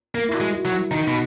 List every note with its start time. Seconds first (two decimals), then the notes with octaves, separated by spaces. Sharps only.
0.15 A#3 A#4
0.28 E4
0.34 F#4
0.40 G#3
0.53 F#4
0.65 F#3
0.72 E4
0.91 D#3 D#4
1.07 B2